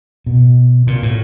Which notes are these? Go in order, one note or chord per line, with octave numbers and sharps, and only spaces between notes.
B2
A#2
A2